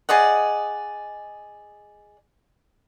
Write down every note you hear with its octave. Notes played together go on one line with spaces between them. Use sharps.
G#4 D5 D#5 F#5